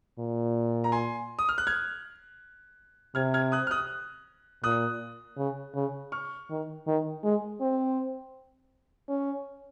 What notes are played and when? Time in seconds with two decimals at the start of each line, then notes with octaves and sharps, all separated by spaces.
0.19 A#2
0.84 A#5
0.92 G#5 C6
1.39 D#6
1.49 F6
1.58 F#6
1.67 F6 G#6
3.15 C3 F6 G#6
3.34 F6 G#6
3.52 D#6 F#6
3.67 F6
3.71 D#6 F#6
4.63 A#2 D#6 F#6
5.38 C#3
5.75 C#3
6.12 C#6 F6
6.50 D#3
6.87 D#3
7.24 G#3
7.60 C4
9.09 C#4